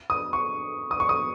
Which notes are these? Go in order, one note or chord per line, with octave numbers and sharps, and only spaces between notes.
D#6
C#6
D#6
C#6
D#6